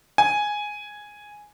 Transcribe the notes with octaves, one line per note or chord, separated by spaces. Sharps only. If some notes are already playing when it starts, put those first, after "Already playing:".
G#5